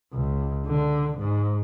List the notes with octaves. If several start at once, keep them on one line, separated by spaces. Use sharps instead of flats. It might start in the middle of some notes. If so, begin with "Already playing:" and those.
C#2
D3
G#2